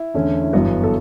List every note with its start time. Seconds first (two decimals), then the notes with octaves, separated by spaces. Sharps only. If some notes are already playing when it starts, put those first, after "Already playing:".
Already playing: E4
0.14 E2 D3 A3 C#4
0.42 E4
0.53 G1 F#2 E3 B3 F#4
0.84 A4